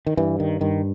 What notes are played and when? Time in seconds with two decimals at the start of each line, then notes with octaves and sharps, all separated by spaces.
0.06 D#3
0.17 G2 E3
0.40 D#3
0.61 G2 D#3